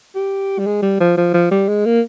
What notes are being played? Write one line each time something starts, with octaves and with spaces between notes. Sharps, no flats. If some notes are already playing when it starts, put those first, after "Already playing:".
G4
G3
G#3
G3
F3
F3
F3
G3
G#3
A#3